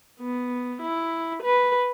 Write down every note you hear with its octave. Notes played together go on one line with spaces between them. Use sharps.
B3
E4
B4